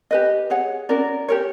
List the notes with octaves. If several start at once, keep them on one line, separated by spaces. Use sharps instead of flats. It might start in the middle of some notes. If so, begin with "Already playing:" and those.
G4 B4 D#5
G#4 C#5 F#5
C#4 F#4 A#4 D5
G4 A#4 C#5